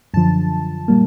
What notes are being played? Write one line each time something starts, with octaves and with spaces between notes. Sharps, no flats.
F#2 D3 F3 A5
A#2 G3 A#3